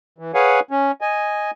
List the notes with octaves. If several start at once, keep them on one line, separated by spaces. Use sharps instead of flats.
E3
G#4 B4 C#5 F5 F#5 G#5
C#4
D#5 G#5